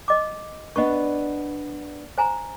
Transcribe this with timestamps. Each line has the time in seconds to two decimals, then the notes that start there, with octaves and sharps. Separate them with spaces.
0.08 D#5 D6
0.76 B3 D4 B4 D#5 C#6
2.18 C5 G#5 A#5